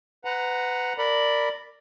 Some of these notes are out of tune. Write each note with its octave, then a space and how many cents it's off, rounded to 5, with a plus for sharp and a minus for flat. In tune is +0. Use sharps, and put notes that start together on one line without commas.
B4 +25 F#5 +0 A#5 +0
A#4 -15 D5 +0 B5 +0